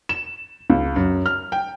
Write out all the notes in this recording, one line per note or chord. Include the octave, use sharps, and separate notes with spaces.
E7
C#2
F#2
F6
G5